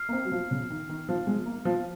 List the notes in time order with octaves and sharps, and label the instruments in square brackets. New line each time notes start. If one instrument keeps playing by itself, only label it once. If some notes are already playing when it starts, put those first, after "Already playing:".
Already playing: [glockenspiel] F6 C7
[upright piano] A#3
C4
F#3
F3
C#3
D#3
D#3
F3
G#3
A#3
F3